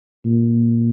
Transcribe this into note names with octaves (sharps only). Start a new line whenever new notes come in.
A#2